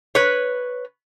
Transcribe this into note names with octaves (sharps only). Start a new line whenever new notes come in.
B4 C#5